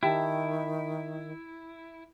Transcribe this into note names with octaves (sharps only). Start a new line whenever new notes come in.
D#3 E4 G4 A5